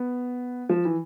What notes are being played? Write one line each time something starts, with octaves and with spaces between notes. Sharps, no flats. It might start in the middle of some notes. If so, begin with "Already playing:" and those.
Already playing: B3
F3
E3